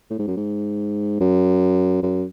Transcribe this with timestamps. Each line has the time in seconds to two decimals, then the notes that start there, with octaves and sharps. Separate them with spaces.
0.11 A2
0.19 G#2
0.27 F#2
0.37 G#2
1.20 F#2
2.03 F#2